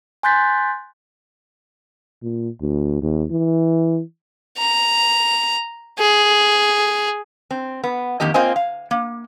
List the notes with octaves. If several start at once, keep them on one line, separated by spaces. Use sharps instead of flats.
G#5 C6 F#6 G6 A6 B6
A#2
D2
D#2
E3
A#5
G#4
C4
B3
F2 D#3 A#3 G4 D#5
A#3 C4 F4 C5 D#5 G#5
F5
A#3